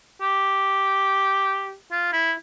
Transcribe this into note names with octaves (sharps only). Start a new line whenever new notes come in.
G4
F4
E4